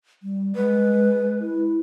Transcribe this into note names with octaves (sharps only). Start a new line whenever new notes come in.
G3
G#3 B4
E4